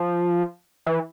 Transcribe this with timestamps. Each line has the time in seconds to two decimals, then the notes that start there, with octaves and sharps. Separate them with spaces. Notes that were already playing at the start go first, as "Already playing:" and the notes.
Already playing: F3
0.86 E3